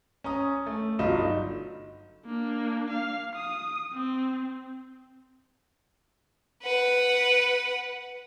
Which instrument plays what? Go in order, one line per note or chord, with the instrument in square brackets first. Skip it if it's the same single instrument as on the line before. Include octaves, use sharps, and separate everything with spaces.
[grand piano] C#4 A#5 D#6
A3
G1 F#3 D#4 F4 B5 E7
[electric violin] A#3 D4
F5
D#6
C4
[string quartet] B4 F#5